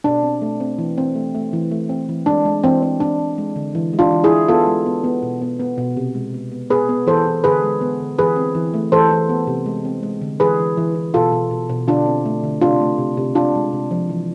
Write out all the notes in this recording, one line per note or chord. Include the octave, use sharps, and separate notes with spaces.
B2 D4
C4
A3
C4
E3
C4
A3
A3
E3
A3
C4
E3
G#3 D4
G#3
E3 C4
C4
C4 D4
C4
G#3
D3
E3
G#3
D4 F4
E3
E4 G#4
E3
B3 F4 A4
G#3
B3
B3
B2
B3
B3
B2
C3
G#3
B3
B3
B3 G#4 B4
B3
E3 A4 C5
E3
D3 G#4 B4
G#3
B3
D3
E3 G#4 B4
C4
E3
A3
E3 A4 C5
E3
B3
C3
G#3
C4
G#3
D3
E3 G#4 B4
E3
E3
E3
B2 F4 A4
B2
B2
B2
D3 D4 F4
C4
A3
D3
C3 D4 F4
A3
C3
C3
G#3 D4 F4
G#3
C3
F3
E3